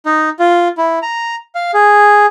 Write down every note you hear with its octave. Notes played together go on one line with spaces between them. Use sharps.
D#4
F4
E4
A#5
F5
G#4